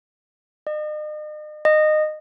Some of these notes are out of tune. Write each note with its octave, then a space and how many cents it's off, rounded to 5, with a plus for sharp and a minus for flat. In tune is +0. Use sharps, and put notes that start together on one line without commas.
D#5 -40
D#5 -20